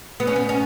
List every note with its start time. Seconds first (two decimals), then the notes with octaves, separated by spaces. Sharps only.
0.20 B3
0.27 C#4
0.36 B3
0.49 C#4